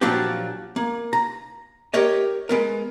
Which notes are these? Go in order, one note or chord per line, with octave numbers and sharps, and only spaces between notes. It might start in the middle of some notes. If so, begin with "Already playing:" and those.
A#2 F3 F#3 D4 F#4 G4
A#3
A#5
G4 A#4 C#5 D#5
G#3 B3 A#4